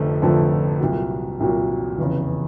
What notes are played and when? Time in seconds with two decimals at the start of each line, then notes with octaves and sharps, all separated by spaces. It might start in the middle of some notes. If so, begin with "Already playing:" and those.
Already playing: F1 F2 D3 F3 A3
0.22 F1 F2 D3 F3 A3
0.80 C2 A#2 F#3
1.40 C2 A#2 F#3
1.98 F1 E2 C#3